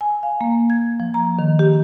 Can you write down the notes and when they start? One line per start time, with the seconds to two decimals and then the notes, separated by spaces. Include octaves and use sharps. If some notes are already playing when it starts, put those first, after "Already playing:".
0.01 G#5
0.23 F5
0.41 A#3
0.70 G#6
1.00 F3
1.14 A#5
1.39 D#3
1.59 G4